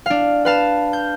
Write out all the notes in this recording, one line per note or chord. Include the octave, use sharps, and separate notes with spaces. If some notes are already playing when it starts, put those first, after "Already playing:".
D4 F5
B4 F5 A5
G6